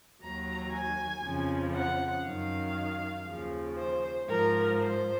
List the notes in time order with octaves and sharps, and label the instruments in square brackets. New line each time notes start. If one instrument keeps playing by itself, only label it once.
[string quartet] D#2 D#3 F#3 A#5
G#5
F2 C#3 F3
F#5
F#2 D#3 F#3 F5
D#2 C#3 F3
C5
G#2 F3 A#4
C5